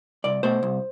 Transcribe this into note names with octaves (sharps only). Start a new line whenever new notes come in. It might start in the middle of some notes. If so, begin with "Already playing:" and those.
C2 D5
B2 A3 C5
C2